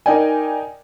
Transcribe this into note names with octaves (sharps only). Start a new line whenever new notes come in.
D#4 A#4 D5 G5 G#5